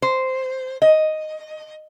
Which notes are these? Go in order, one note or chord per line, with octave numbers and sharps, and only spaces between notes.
C5
D#5